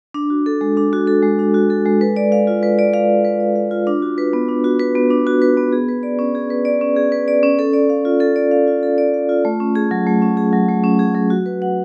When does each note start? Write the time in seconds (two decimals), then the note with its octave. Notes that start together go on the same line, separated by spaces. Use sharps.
0.14 D4
0.30 F#4
0.46 A4
0.61 G#3
0.77 D4
0.93 F#4
1.07 A4
1.23 G#3
1.39 D4
1.54 F#4
1.70 A4
1.85 G#3
2.01 B4
2.16 D5
2.32 F5
2.47 F4
2.63 B4
2.79 D5
2.94 F5
3.09 F4
3.25 B4
3.40 D5
3.56 F5
3.71 F4
3.87 D4
4.02 F#4
4.18 B4
4.33 B3
4.49 D4
4.64 F#4
4.79 B4
4.95 B3
5.11 D4
5.27 F#4
5.42 B4
5.57 B3
5.73 G#4
5.89 B4
6.03 D5
6.19 C#4
6.35 G#4
6.50 B4
6.65 D5
6.81 C#4
6.97 G#4
7.12 B4
7.28 D5
7.43 C#4
7.59 A4
7.73 D5
7.90 F5
8.05 F4
8.20 A4
8.36 D5
8.51 F5
8.67 F4
8.83 A4
8.98 D5
9.14 F5
9.29 F4
9.45 A3
9.60 C#4
9.75 G#4
9.91 F#3
10.07 A3
10.22 C#4
10.37 G#4
10.53 F#3
10.68 A3
10.84 C#4
10.99 G#4
11.15 F#3
11.30 F#4
11.46 B4
11.62 F#5